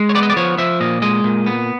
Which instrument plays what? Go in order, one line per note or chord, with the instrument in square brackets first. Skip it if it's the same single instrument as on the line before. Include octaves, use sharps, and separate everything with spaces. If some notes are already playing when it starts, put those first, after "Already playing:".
Already playing: [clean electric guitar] G#3
C#5
B3 D5
D#5
D5
F3 C#5
F3 E5
A#2 D#5
G#3 D#5
A#2
B3